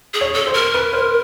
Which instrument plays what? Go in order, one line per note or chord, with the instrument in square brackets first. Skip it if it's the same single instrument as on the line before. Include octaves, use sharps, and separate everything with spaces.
[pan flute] G#4
[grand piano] C#5
[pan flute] A4
[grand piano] C5
[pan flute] A#4
[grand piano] B4
C5